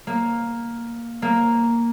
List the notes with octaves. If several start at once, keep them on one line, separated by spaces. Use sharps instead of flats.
A#3
A#3